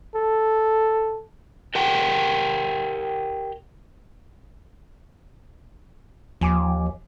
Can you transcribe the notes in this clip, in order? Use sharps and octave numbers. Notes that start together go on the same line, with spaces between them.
A4
G4 A#4 F#5 G5
D#2 F3 G#5 D6